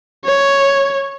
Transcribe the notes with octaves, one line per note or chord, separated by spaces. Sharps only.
C#5